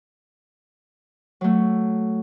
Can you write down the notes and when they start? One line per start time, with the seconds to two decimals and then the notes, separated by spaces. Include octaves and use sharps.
1.41 F#3 A3